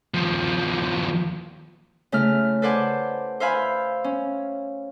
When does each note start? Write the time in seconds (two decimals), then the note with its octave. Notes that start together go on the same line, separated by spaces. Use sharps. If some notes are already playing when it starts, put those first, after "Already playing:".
0.14 D#2 F3
2.12 C#3 A3 E4 F6
2.62 A4 B4 C5 D5 F#5 G#5
3.40 C5 E5 F5 G#5 B5
4.04 C#4